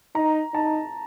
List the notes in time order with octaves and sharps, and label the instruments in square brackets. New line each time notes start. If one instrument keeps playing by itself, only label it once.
[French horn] D#4 [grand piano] A#5
[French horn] D#4 [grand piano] A5